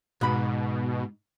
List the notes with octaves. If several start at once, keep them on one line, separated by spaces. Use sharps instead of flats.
G#2 B2 B5